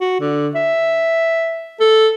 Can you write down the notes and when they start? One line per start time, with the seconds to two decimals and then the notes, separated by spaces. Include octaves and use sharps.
0.01 F#4
0.20 D3
0.55 E5
1.80 A4